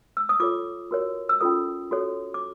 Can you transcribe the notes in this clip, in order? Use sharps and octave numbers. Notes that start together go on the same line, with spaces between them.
E6
D#6
F4 A4 C#5 D6
F#4 A#4 C#5
E6
C#4 F4 A4 D#6
F#4 A4 C#5
D6